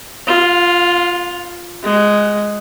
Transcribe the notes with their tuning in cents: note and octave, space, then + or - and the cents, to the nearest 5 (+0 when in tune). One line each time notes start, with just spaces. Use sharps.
F4 +0 F5 +40
G#3 +0 F#5 +15